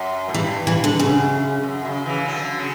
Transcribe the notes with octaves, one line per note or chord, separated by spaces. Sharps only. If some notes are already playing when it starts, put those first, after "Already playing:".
Already playing: F#2
A2
G2 E3
E3
D3
F#2 C#3
F#2
C#3
C#3 E3
D3 F#3
C#3